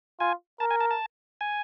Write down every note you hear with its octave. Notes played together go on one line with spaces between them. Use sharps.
F4 G#5
A#4 A5
G#5
A5
A5
G#5